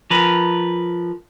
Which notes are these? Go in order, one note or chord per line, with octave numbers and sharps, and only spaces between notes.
F3 A#4 B4